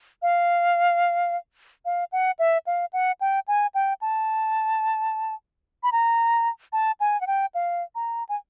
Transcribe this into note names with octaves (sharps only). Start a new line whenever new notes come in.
F5
F5
F#5
E5
F5
F#5
G5
G#5
G5
A5
B5
A#5
A5
G#5
F#5
G5
F5
A#5
G#5